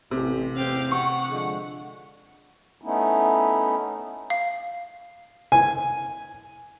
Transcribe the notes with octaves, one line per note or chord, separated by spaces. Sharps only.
A1 C3
A1 E2 C4 G4 F5
F#5 C#6 C#7
D3 F3 G#3
A3 B3 C#4 D#4 E4
F5
G#5